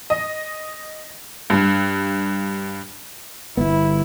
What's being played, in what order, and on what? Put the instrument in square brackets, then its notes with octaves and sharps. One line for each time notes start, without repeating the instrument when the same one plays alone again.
[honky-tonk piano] D#5
G2
[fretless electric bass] G1 B3 [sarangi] E4